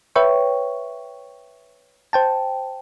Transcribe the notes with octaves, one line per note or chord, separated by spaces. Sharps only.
B4 C#5 E5 G5 C#6
C5 G5 A5